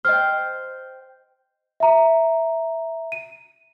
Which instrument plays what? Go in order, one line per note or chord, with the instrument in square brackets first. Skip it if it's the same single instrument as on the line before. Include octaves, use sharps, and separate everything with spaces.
[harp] C5 G5 [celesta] D#5 F6
[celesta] E5 A#5
D#7